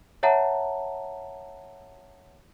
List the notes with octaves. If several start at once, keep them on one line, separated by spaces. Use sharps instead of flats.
C#5 E5 F#5 A5 A#5